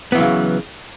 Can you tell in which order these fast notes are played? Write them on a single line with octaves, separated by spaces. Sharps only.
B3 E3 F#3 C#3